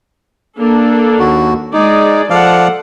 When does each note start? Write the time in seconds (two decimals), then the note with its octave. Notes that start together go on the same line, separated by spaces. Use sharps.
0.58 A#3 D4 A4
1.19 D#2 F#4
1.73 G#3 D#4 G#4 D5
2.30 F3 A4 D5 F5 F#5